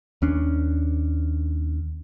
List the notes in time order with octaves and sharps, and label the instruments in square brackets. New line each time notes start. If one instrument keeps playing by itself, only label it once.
[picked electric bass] D#2 C#4 D4